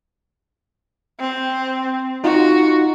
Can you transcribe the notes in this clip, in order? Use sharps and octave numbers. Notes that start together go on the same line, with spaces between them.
C4
D#4 F4 F#4